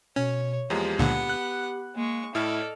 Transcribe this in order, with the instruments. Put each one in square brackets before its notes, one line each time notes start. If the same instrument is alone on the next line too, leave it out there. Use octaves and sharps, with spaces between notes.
[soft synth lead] B2 [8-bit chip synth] C#4 [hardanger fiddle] C#5
[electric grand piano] E2 F3 G#3 [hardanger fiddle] A#3 [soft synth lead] G4
[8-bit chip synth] C#2 A#2 D3 [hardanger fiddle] B3 F#5
[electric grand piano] F#6
[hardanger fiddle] G#3 C#6 [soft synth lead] A#3
[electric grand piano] A2 E4 F6 [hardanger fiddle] A4 D5 [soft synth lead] D#5